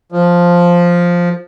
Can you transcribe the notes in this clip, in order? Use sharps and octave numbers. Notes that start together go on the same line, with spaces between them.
F3